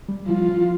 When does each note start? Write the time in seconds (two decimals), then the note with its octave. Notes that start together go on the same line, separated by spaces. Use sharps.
0.09 G3
0.28 F3 F4
0.49 F3